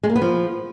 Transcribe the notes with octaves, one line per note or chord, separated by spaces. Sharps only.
G#3
A#3
B3
F3